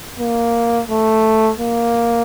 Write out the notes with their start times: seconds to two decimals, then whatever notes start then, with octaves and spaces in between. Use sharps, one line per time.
0.19 A#3
0.89 A3
1.59 A#3